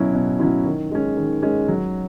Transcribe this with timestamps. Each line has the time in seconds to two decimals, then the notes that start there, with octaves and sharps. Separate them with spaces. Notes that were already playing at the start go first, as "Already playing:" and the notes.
Already playing: B2 F#3 C#4 E4
0.14 B2
0.39 F#3 C#4 E4
0.65 D#3
0.91 G#3 C#4
1.17 D#3
1.42 G#3 C#4
1.68 F#3